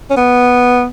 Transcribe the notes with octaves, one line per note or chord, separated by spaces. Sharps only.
C#4
B3